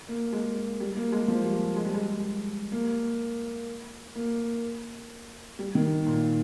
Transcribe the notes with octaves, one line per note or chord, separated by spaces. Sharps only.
A#3
G#3
G3
A#3
G#3
F3
G3
G#3
G3
G#3
A#3
A#3
G3
D#3
A#2